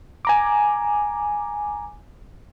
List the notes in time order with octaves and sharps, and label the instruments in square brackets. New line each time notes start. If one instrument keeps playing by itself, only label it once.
[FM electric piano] G#5 A#5 D6